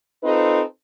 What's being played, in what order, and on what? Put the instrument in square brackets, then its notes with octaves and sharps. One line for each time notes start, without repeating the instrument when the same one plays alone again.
[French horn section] C4 D#4 F4 A4 B4